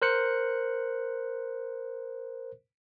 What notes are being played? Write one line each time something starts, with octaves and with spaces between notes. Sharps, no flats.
A#4 C5 F#6 C#7